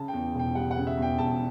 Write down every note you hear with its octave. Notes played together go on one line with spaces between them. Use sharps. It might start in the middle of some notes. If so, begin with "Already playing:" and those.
Already playing: C#3 A5
E2 G5
E1 G5
G3 F#5
F#5
C#3
E5
E2
G5
E1 A5